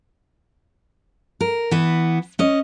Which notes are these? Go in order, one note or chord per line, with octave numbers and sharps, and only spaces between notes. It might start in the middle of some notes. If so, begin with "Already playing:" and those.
A#4
E3 B3
C#4 D#5